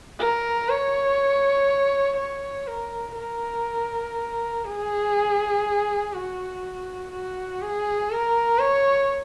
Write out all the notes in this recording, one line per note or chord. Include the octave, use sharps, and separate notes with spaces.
A#4
C#5
C#5
A#4
A#4
G#4
F#4
F#4
G#4
A#4
C#5